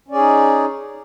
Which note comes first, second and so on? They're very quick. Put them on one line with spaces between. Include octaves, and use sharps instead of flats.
C#4 D5 G#4 D#4